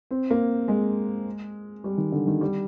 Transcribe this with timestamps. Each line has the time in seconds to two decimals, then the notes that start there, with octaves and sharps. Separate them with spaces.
0.11 C4
0.31 A#3
0.68 G#3
1.84 G3
1.98 D#3
2.12 D3
2.27 D#3
2.41 G3